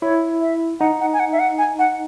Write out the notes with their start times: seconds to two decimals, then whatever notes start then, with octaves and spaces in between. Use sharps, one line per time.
0.02 E4 C#5
0.41 E5
0.80 D#4 F#5
1.00 F#5
1.13 G#5
1.20 F#5
1.32 E5
1.39 F#5
1.58 G#5
1.79 F#5